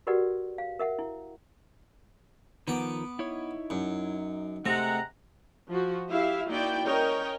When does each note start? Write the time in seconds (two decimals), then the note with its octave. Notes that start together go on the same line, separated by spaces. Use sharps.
0.07 F#4 G4 A#4 B4 D5 F#5
0.58 F5
0.79 A#4 E5 F#5
0.99 E4
2.68 D#3 F3 B3 A#4 D6
3.19 D#4 E4 C#5
3.70 F#2
4.66 C3 G#3 A3 F#5 A#5
5.69 F3 F#4
6.09 E4 G4 E5 F5
6.48 A#3 D#4 E4 F#4 D5 G5
6.85 C#4 A#4 C#5 D#5 G5